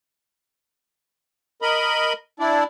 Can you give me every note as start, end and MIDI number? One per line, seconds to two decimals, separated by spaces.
1.62 2.13 70
1.62 2.13 75
1.62 2.13 83
2.40 2.64 62
2.40 2.64 64
2.40 2.64 74